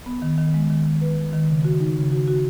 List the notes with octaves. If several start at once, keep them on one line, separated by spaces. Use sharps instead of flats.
B3
D#3
D#3
G#3
D#3
D#3
B4
D#3
D#3
C#3
F#4
D#4
C#3
F#4
F#4